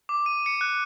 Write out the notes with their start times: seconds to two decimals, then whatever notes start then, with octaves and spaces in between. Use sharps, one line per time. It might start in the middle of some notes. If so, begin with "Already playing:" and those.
0.09 D6
0.26 D#7
0.46 C#7
0.61 F#6